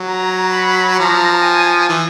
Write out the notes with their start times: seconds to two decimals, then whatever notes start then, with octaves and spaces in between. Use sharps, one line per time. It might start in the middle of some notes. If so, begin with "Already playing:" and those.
Already playing: F#3
0.09 A#5
0.53 B5
0.98 F3 A#5
1.43 G#5
1.89 E3